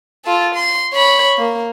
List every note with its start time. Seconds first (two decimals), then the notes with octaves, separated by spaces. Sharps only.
0.25 F4 A4
0.55 C6
0.93 C#5 B5
1.37 A#3